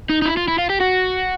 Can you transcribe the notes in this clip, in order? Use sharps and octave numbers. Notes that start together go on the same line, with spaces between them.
D#4
D#4
E4
F4
E4
F4
G4
F#4